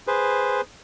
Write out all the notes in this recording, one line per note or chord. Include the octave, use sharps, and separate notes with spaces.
G#4 B4 C5